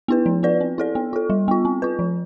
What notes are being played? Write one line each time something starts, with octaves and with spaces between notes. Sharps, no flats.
B3 E4 B4
F3
B3 F4 B4 D5
C4
E4 A4 D5
B3
F4 A4
G3
B3 F4
C4
F4 B4
F3